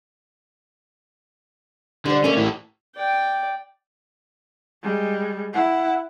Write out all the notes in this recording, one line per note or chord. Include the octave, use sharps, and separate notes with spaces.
D3 G3 C5
A3 A#3 C#4 A4
A2 E3
D5 G5
G3 G#3
E4 F#5